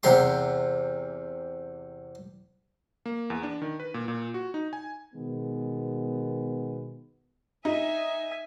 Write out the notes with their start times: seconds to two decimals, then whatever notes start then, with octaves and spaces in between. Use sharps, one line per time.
0.03 E2 C3 A#5 C6
3.06 A#3
3.30 E2
3.43 D4
3.62 D#3
3.80 B4
3.94 A#2
4.08 A#2
4.34 F#4
4.54 D#4
4.73 G#5
5.14 B2 D#3 G#3 B3
7.65 D#4 E5 G#5